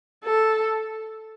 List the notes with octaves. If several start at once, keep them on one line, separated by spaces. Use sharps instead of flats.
A4